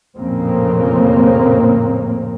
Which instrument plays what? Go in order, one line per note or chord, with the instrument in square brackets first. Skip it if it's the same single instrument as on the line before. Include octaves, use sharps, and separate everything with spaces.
[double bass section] A1 F2 A#2 C#3 A#3 C4